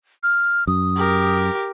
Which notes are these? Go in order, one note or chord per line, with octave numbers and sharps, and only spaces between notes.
F6
F#2 D#6
G4 A#4